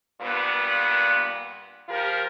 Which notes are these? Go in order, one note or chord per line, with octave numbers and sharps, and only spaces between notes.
G2 A#2 B3 B4
F3 F4 G4 A#4